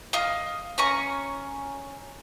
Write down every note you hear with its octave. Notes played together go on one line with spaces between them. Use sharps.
D#5 F5 D#6 F6
C#4 G#5 A#5 C#6